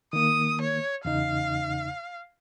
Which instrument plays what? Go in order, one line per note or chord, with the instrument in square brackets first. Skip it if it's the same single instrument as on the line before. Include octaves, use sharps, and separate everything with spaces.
[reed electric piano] D#3 A#3 [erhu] D#6
[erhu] C#5
[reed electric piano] E2 C#3 D#4 [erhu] F5